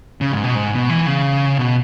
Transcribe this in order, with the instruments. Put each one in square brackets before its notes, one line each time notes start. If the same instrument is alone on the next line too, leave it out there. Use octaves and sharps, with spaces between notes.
[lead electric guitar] C#3
G#2
B2
G#2
B2
E3
C#3
B2